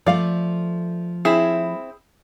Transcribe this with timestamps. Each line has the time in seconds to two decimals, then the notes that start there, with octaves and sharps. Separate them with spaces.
0.06 F3 A3 D5 F5
1.25 C4 E4 G#4